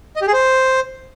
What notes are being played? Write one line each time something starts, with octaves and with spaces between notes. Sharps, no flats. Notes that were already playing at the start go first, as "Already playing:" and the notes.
D#5
G4
G#4
C5